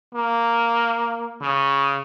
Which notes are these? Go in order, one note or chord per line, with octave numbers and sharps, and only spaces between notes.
A#3
C#3